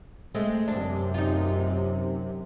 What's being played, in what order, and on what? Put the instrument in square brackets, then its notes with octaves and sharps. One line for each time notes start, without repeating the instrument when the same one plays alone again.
[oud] G#3 A3 C4
[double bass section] F#2 C3 [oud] D4
[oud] D#4 F4